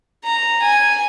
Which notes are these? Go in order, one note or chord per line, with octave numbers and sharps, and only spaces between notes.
A#5
G#5